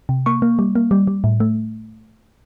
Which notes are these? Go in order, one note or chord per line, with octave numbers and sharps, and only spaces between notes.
C3
A#3 C#6
A#3
G3
A#3
G3
G3
A2
A3